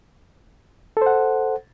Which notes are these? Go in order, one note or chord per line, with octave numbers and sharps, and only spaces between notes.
A4 C5 F#5